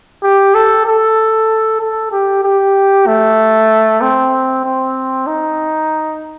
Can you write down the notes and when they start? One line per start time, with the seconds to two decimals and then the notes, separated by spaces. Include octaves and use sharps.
0.23 G4
0.55 A4
0.86 A4
1.81 A4
2.12 G4
2.44 G4
3.07 A3
4.01 C4
4.65 C4
5.27 D#4